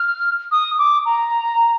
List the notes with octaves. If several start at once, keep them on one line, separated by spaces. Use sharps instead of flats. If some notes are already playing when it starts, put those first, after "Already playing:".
Already playing: F6
D#6
D6
A#5